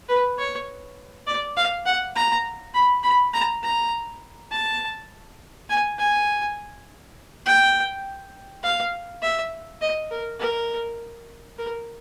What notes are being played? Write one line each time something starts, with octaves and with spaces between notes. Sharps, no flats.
B4
C#5
D5
F5
F#5
A#5
B5
B5
A#5
A#5
A5
G#5
G#5
G5
F5
E5
D#5
A#4
A#4
A#4